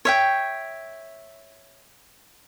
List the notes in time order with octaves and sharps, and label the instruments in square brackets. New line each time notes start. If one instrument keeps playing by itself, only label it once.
[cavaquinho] C#5 E5 G5